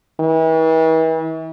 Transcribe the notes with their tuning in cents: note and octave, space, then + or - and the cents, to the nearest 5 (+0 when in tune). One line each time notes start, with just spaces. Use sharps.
E3 -40